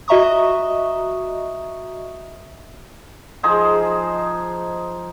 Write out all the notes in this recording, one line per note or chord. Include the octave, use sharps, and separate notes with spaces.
F#4 D#5 E5 A#5 C#6 D#6
F3 D#4 G#4 C5